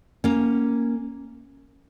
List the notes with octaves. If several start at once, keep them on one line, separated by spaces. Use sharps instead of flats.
A#3 C#4